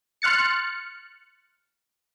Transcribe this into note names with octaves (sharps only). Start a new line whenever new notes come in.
C6 F6 F#6 A6 C#7